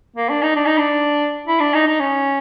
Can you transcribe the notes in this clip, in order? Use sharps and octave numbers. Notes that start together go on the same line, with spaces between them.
A#3
D4
D#4
D4
D#4
D4
E4
D4
D#4
D#4
C#4